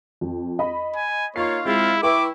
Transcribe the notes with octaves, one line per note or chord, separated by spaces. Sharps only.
F2
D#5 B5
G#5
A#3 D#4 F4 C#5 C#6 C7
G#3 C4 E4 F4
E4 B4 G5 C#6 D6